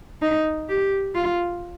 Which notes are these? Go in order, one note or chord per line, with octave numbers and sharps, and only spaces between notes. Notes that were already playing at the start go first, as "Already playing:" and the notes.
D#4
G4
F4